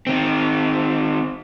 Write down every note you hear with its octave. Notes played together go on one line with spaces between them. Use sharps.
D#3 C4